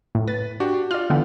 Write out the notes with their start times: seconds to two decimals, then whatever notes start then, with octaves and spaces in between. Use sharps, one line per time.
0.15 A2
0.28 B4 A6
0.60 D4 F#4 G4
0.91 F4 D5 F6
1.10 D3 E3 B3